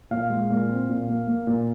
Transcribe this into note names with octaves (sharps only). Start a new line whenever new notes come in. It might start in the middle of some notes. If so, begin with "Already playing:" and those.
A#2 F5
G#3
A#2
C4
A#2
A#3
A#3
A#2